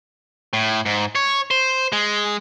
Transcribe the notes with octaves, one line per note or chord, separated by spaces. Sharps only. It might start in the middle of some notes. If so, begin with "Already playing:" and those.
A2
G#2
C#5
C5
G#3